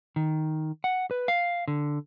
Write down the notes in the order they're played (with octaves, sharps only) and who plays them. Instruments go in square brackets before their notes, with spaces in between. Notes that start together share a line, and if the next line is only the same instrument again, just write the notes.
[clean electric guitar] D#3
F#5
B4
F5
D3